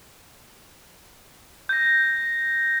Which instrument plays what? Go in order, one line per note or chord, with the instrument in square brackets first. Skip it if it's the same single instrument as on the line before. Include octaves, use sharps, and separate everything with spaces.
[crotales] G6 A#6